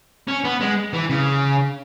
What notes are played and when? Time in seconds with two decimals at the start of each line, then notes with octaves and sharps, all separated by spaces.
0.28 C#4
0.44 B3
0.60 G#3
0.93 E3
1.09 C#3